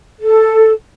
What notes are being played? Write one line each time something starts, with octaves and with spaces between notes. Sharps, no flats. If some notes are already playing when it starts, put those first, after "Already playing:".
A4